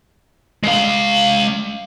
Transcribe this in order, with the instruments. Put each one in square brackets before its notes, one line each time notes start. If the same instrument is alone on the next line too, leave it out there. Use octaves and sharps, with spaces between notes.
[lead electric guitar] G#3 F5